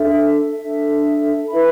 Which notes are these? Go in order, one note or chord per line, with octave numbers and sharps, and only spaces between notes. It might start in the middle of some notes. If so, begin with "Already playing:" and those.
Already playing: D4 A4 E5
D4 A4 E5
E4 B4 E5 B5